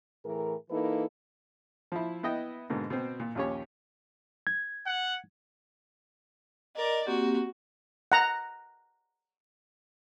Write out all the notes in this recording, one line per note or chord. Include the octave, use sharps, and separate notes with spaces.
A2 E3 G#4 A#4
E3 A#3 D#4 E4 A4 B4
F3 E4
B3 E4 D#5 G5
G#2 B2 D3 A#3
B2 C4
A#2
A#1 D#2 C#4 G4 C#5
G#6
F#5
A#4 D5 D#5
A#3 C4 F#4 G4
F#5 A#5